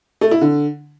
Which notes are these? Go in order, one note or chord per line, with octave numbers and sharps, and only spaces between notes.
A3
E4
D3